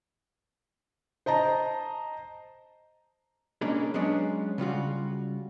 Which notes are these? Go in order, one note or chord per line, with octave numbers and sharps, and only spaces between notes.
C5 D#5 A5 A#5
B2 A#3 C#4 D4 G#4
F#3 G#3 B3 C#4 D4
C#3 G3 F4 F#4